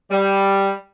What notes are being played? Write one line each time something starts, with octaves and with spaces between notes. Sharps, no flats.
G3